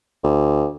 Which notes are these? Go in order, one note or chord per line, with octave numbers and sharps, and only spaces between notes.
D2